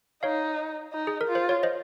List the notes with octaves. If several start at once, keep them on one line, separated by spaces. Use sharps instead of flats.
D#4 C#5 F5
D#4
G#4
A#4
F4
C5
C#5
C5 D#5